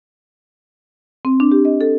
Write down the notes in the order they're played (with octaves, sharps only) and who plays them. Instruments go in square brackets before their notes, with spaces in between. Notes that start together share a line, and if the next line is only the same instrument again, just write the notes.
[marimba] C4
D4
G4
D#5
A4